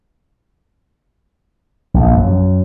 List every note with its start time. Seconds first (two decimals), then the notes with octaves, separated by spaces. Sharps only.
1.94 A#1
2.15 F#2